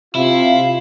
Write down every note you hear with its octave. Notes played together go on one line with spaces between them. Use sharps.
C3 E4 F4 F5